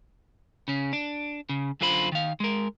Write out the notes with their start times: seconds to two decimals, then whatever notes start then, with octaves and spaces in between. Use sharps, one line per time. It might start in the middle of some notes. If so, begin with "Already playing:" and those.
0.68 C#3 C#4
0.93 D4
1.49 C#3
1.81 F#2 D3 F4 C5 B5
2.12 D#3 F5
2.40 G#3 A#4